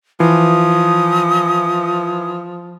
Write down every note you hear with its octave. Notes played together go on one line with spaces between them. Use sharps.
E3 F3 D#6